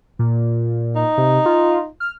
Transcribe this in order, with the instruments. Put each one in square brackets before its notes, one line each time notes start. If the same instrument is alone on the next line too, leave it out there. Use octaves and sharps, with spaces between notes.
[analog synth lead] A#2
[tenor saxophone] D#4
[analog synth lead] C3
F4
F6